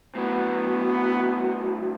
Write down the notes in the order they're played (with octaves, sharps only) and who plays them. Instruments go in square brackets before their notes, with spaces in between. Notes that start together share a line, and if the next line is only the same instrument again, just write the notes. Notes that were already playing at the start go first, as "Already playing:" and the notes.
[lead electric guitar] A2 F#3 [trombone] B3